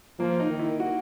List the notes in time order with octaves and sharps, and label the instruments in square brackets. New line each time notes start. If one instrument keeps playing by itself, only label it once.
[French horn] F3 [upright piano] A#3
[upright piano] D#4
[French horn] D#3
[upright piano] E4
F#4